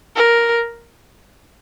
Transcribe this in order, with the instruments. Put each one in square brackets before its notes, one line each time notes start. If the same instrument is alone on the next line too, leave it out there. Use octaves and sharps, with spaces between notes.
[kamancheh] A#4